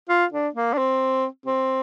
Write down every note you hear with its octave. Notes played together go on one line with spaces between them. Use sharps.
F4
D4
A#3
D4
C4
C4